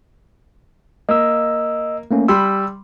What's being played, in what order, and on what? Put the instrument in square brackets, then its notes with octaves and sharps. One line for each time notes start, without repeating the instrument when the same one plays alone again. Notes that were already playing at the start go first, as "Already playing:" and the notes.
[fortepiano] A#3 [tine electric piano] D#5 E6
[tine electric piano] A3 A#3 C#4
[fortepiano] G3 B5 C6 [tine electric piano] E6